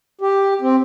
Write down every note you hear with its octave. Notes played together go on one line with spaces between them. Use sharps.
G4
C4